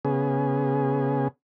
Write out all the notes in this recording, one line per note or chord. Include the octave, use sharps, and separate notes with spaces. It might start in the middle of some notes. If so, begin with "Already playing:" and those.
C#3 B3 G#4